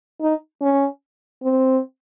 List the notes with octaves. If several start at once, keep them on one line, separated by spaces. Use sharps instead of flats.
D#4
C#4
C4